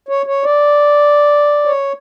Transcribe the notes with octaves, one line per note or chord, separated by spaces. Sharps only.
C#5
C#5
D5
C#5